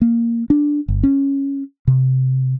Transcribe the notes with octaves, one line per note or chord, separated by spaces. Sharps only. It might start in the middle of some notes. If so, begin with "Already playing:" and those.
A#3
D4
G1
C#4
C3